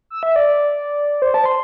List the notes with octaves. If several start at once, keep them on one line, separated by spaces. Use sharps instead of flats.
E6
E5
D5
C5
A5
C6